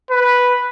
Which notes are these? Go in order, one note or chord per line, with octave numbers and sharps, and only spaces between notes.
B4